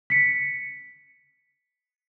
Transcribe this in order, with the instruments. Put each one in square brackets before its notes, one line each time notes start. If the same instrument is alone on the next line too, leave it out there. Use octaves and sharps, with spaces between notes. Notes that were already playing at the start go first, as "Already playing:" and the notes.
[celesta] B6 C#7